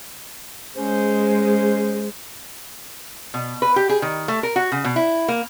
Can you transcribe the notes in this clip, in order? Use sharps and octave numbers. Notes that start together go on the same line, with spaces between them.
G#3 C#4 C5
B2
B4
G4
G#4
D#3
A3
A#4
F#4
C#3
B2
E4
A#3